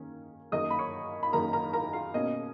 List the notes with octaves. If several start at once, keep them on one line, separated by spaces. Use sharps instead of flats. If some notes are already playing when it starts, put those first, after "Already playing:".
Already playing: D#3 A#3 C#4
F#2 D#3 A#3 D#4 D#5 D#6
B5
C#5 C#6
B5
F#2 D#3 A#3 D#4 A#4 A#5
A#4 A#5
A#4 A#5
F4 F5
B2 A#3 C#4 D#5